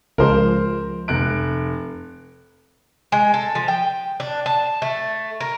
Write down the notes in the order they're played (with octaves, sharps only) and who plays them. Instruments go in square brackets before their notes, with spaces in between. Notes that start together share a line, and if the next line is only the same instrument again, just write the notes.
[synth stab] C#2 F3 G#3 [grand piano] A#4 C5
[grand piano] F1 F#6 D7
[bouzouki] G#3
A4
F3
G5
D4
A5
A3
A#4